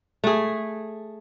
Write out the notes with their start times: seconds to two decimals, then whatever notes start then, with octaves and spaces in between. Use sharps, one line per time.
0.24 A3 G#4